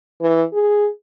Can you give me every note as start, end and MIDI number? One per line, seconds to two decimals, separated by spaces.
0.21 0.43 52
0.53 0.88 68